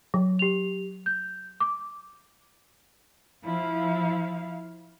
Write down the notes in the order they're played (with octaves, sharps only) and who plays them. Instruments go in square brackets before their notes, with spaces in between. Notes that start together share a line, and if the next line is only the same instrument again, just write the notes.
[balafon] F#3
[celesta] G4 F7
G6
D6
[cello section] F3 E4 F5